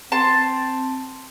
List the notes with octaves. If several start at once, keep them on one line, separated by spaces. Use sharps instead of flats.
C4 A5 C6